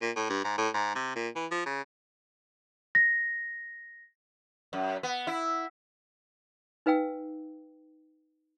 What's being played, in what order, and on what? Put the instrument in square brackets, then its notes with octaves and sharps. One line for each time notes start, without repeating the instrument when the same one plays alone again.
[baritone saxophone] A#2
A2
G2
G#2
A2
G#2
C3
A#2
E3
F3
C#3
[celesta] A#6
[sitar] F#2
B3
E4
[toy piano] D#4 B4 F5 G5 E6